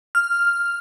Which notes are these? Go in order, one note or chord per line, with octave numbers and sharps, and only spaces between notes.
F6